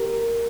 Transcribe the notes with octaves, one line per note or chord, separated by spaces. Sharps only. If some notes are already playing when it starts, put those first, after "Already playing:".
Already playing: G4 A#4